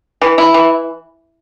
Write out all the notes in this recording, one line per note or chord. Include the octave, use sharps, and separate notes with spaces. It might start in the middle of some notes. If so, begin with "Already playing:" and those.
E3
E4
E3